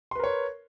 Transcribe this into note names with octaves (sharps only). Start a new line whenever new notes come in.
A#4 B4 C#5 C6